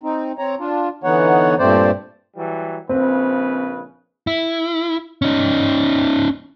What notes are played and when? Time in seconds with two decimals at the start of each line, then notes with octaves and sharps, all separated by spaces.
0.03 C4 D#4
0.38 C4 C#5 A#5
0.59 D4 F4
1.04 D3 E3 B3 D#4 C#5 F#5
1.59 G2 A#2 A3 C4 C5 D5
2.37 E3 F#3 G3
2.89 A#1 C#3 C4 B4
4.27 E4
5.22 C#4 D#4